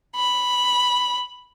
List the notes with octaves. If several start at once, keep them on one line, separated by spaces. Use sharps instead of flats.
B5